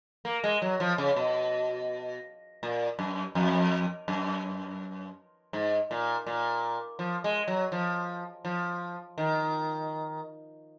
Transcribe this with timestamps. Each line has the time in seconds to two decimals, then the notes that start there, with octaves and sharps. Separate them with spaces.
0.25 A#3
0.44 G#3
0.62 F#3
0.80 F3
0.98 C#3
1.16 B2
2.63 A#2
2.99 F#2
3.35 F2
4.08 F#2
5.53 G#2
5.91 A#2
6.27 A#2
6.99 F3
7.24 G#3
7.48 F#3
7.72 F3
8.45 F3
9.18 D#3